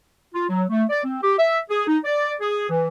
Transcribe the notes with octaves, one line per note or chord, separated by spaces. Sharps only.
F4
F#3
A3
D5
C4
G4
E5
G#4
D#4
D5
G#4
E3